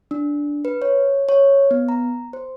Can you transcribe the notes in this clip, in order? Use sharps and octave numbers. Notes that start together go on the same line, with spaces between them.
D4
B4
C#5
C#5
B3
A#5
C5